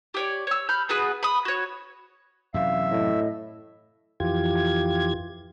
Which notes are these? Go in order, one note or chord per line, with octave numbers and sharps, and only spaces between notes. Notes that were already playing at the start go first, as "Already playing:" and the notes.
G4 C#5 D5
C#5 E6
B5 F6 G6
B3 F#4 G#4 B4
B5 D#6
F#4 C#5
F#2 C3 E3 E5 F5
A2 D#5
F2 E3 F4 G4 G#6